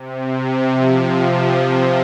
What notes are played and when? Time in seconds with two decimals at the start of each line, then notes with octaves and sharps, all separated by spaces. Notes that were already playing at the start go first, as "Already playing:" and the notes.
Already playing: C3
0.71 F3